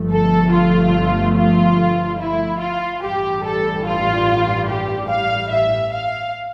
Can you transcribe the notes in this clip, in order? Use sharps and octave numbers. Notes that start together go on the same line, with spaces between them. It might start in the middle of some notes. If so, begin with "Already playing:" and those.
Already playing: G1 G2 F3 A3
A4
F4
F4
E4
F4
A1 G2 E3 G3 G4
A4
F4
G4
F5
E5
F5